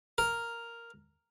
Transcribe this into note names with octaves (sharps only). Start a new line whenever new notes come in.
A#4